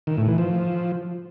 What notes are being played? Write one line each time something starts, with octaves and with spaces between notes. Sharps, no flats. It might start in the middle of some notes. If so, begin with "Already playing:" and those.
D#3
A2
E3
F3